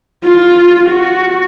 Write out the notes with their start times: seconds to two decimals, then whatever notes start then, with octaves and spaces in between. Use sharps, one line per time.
0.24 F4
0.89 F#4